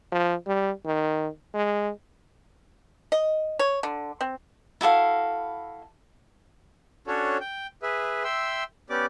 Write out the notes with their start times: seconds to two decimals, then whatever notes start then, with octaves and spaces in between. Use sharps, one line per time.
0.12 F3
0.47 G3
0.85 D#3
1.54 G#3
3.12 D#5
3.59 C#5
3.83 D3
4.21 C4
4.81 E4 F#4 A4 F5
7.07 C#4 D4 F#4 A4 C#5
7.41 G5
7.82 G#4 B4 E5
8.24 E5 G5 C6 E6
8.90 B3 C#4 G4 D5 D6